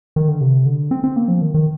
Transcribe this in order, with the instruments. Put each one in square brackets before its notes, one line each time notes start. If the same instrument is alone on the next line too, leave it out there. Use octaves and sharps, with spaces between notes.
[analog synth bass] D#3
D3
C3
D3
C4
C4
A#3
F3
D#3
D#3